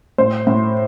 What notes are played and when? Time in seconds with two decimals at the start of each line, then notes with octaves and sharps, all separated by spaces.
0.18 A2 C5
0.47 A2